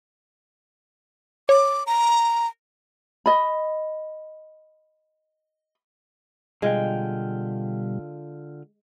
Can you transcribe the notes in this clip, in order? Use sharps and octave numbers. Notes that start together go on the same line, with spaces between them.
C#5 D6
A#5
D#5 B5
B2 D3 G3 G#3 F4 G5